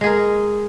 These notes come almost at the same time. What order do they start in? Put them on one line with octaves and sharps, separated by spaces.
G#3 G#4 A#4